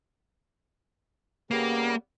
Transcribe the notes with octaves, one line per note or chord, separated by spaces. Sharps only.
C#3 G3 A#3 B3